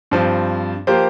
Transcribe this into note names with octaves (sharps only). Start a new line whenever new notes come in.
G2 F3 C4
F3 A#3 G4 C5